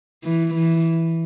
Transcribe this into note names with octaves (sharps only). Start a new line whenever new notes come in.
E3
E3